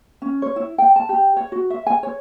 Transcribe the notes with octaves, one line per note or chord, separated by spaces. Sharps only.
C#4
C#5
E4
G5
A5
G4
C#5
F#4
E5
G#5
C#5